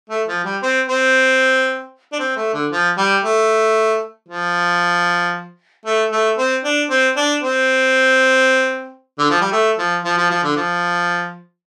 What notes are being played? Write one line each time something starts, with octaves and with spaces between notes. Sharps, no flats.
A3
F3
G3
C4
C4
D4
C4
A3
D3
F3
G3
A3
F3
A3
A3
C4
D4
C4
D4
C4
D3
F3
G3
A3
F3
F3
F3
F3
D3
F3